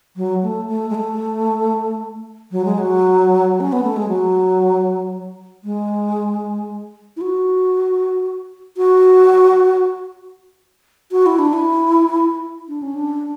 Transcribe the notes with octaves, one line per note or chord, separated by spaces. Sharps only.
F#3
A3
A3
G#3
A3
F#3
G#3
F#3
C#4
B3
A3
G#3
F#3
G#3
E4
F#4
F#4
F#4
E4
D4
E4
D4
C#4
D4